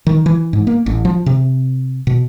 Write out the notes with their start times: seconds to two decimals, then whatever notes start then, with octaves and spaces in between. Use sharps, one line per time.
0.07 D#3
0.26 E3
0.53 G#2
0.67 A#3
0.86 A1
1.05 F3
1.26 C3
2.07 B2